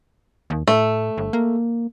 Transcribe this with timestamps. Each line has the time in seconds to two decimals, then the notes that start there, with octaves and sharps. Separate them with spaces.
0.50 D#2
0.68 A2 A3
1.17 G1
1.33 A#3